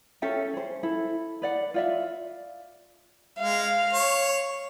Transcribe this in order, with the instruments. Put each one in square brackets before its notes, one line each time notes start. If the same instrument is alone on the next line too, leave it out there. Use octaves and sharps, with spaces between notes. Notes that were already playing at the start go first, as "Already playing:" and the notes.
[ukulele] C#4 A4 E5 G5
G#4 C5
E4 A4
B4 D5 F#5
F4 D5 E5
[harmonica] G#3 [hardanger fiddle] F5
[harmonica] C#5